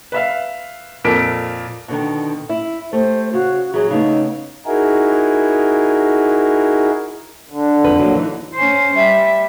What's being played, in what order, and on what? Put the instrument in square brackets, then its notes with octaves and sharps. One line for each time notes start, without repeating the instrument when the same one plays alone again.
[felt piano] B4 E5 F5
F2 A#2 A4 A#4 B6 D7
[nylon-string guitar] B2 D3 D#3
E4
[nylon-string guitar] A3 G4 [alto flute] C5
[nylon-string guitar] C#3 [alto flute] F#4
[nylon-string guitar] E3 F#3 [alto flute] G#4
[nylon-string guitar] C#3 A3 B3 [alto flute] D#4
[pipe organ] D#4 E4 F#4 G#4 A#4
[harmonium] D3
[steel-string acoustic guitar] F2 B4
F#3 G#3 A#3
E3 D#4
[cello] C#4 C5
[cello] G3 [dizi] E5